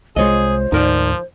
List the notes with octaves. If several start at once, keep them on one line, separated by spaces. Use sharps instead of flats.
C2 G3 G#3 F4 G#4 C5 C#5 D#5
D2 G#2 F3 D#4 A#4 D5